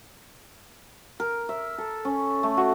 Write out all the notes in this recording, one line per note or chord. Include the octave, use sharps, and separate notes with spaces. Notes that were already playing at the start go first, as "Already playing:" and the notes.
A#4
E5
A4
C#4
A3
F#4